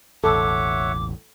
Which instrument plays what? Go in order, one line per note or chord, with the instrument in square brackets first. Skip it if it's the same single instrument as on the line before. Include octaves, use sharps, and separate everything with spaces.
[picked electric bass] E1 A1 [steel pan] A4 [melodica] C#5 E5 F#5 [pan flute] D6